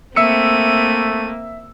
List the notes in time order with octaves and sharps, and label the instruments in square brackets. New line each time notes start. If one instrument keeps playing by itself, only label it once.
[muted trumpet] A3 [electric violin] A#3 [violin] C4 D#7 [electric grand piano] E5 E6 C#7